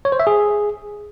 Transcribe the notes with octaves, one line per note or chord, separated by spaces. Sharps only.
C#5
C5
E5
G#4